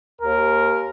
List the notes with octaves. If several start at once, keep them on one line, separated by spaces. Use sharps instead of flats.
D#2 A#4